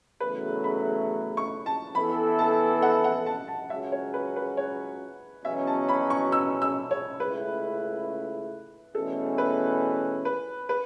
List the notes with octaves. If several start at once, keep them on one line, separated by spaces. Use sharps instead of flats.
E2 C#3 F#3 A3 B4
B5
C#6
A5
E3 B3 E4 A4 B5
A5
F#5
F#5
A5
A5
C#2 C#3 F#3 C#4 F#4 E5
C#5
B4
B4
C#5
E2 B2 F#3 C#4 E5
A5
B5
C#6
E6
E6
C#5
C#2 C#3 A3 E4 B4
E2 B2 A3 C#4 A4
B4
B4
B4